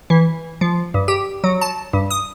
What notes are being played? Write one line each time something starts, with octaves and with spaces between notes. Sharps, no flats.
E3
F3
G2
G4
F#3
A5
G2
D#6